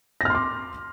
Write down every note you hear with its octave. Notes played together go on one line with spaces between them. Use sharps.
C6 D6 F6 A#6